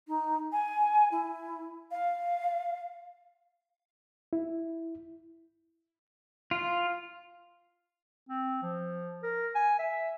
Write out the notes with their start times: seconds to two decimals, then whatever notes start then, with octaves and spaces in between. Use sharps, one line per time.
0.08 D#4
0.52 G#5
1.11 E4
1.91 F5
4.33 E4
6.51 F4
8.29 C4
8.62 F3
9.23 A#4
9.55 G#5
9.79 E5